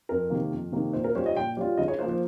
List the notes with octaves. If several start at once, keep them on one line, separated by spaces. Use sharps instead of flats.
F2 A#4
C3 D#3 A#3
F2
C3 D#3 A#3
A#2 C5
A#4
G3 C#4 F4 C5
D#5
A#2 G5
G3 C#4 F4
C#3 D#5
C#5
F3 A#3 F4 C5
C5